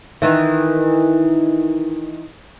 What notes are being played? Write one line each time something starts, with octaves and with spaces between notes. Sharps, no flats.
D#3 E3